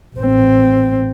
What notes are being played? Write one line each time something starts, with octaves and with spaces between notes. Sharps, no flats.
A1 C4